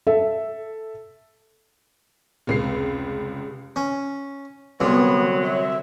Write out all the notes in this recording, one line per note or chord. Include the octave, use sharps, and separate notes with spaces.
A4 E5
F1 C#2 C7
C#4
C2 D3 F#3 B3
E5